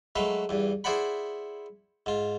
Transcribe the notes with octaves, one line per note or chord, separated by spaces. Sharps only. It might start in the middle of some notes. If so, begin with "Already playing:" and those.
F#3 G#3 A3 B4 F5
E2 G2
E4 G#4 C5 D5 F#5 B5
G#2 F4